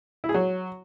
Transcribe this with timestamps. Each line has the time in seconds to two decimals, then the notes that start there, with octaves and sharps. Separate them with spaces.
0.24 E4
0.29 G#4
0.34 F#3